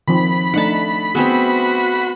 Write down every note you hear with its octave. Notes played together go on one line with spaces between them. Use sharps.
D#3 F3 C4 B5
A3 D4 D#4 F#5 A5
B3 C4 F#4 G#4 C5